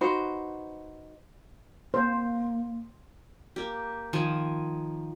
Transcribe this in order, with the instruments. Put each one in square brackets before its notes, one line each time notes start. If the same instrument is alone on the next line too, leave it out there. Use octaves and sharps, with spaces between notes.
[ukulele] D#4 F#4 B4 C5
[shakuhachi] A#3 [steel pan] C5
[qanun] A#3 G4
D#3 F3 G#5